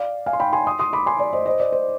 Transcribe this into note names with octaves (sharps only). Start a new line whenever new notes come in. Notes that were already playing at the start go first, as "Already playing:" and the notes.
Already playing: D5 F5
F5 G#5
C6
G5 B5
G#5 C6
C6 D#6
C6 D#6
B5 D6
G#5 C6
D5
C5 D#5
C5 D#5
D5
C5